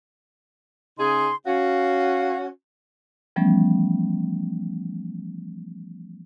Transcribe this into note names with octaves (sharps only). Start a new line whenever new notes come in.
C#3 D#4 G#4 C6
C#4 F#4 F5
E3 F3 G3 A3 B3 C#4